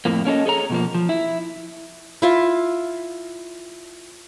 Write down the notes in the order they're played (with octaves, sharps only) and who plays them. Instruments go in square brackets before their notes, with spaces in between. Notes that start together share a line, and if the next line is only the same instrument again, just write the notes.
[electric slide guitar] F2 A2 F3 A#3
A#3 C#4 A4 D#5
G#4 A4 C#5 A#5
B2 F3 A#3
F3
E4
[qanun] E4 F4 E5